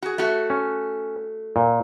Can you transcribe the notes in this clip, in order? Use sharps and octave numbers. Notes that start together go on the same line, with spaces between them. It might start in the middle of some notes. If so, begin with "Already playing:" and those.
F#4 G#4
A3 F#4
C#4
A#2